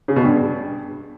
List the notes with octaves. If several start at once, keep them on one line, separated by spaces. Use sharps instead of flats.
C#3
B2
G2